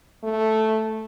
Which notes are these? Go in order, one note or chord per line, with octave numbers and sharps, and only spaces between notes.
A3